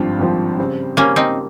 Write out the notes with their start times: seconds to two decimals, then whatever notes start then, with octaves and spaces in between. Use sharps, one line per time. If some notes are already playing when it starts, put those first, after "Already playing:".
Already playing: G#1 G2 F3 C4 F4
0.19 G#1 G2 F3 C4 F4
0.58 C#3 G3 C4
0.97 C#3 G3 A#3 C4 C#4
1.16 C4 D#4